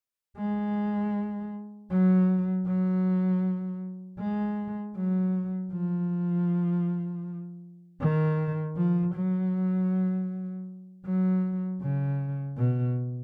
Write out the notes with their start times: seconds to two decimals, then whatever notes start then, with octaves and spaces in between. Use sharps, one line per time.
0.38 G#3
1.91 F#3
2.66 F#3
4.19 G#3
4.96 F#3
5.72 F3
8.00 D#3
8.76 F3
9.15 F#3
11.05 F#3
11.81 C#3
12.57 B2